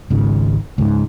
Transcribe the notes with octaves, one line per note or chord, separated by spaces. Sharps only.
G#1 C#2 G#2 C#3
C#2 G#2